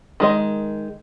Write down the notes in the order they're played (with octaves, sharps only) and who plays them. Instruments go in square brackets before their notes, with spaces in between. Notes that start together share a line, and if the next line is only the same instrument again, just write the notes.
[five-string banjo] D#3 G#3 D#5